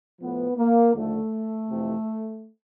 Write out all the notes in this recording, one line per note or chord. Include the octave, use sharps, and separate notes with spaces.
A2 F3 B3
A#3
D#2 D3 F3 A3
F2 C3 E3